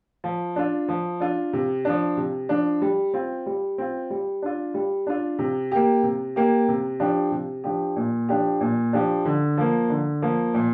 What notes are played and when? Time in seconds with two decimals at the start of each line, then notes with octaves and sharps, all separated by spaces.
0.24 F3
0.56 D4 F4
0.88 F3
1.20 D4 F4
1.53 C3
1.85 F3 D4
2.17 C3
2.49 F3 D4
2.82 G3
3.14 C4 F4
3.46 G3
3.78 C4 F4
4.10 G3
4.42 D4 F4
4.74 G3
5.07 D4 F4
5.39 C3
5.72 A#3 G4
6.03 C3
6.36 A#3 G4
6.68 C3
7.00 F3 D4 G4
7.32 C3
7.64 F3 D4 G4
7.96 A#2
8.29 F3 D4 G4
8.61 A#2
8.93 F3 D4 G4
9.25 D3
9.58 F3 A#3
9.90 D3
10.22 F3 A#3
10.54 A#2